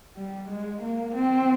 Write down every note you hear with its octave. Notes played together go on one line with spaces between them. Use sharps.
G3
G#3
A#3
C4